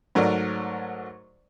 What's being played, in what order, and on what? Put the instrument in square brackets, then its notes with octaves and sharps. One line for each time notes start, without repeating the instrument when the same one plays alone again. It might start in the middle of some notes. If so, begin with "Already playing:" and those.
[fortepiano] G#2 F#3 A3 A#4 D5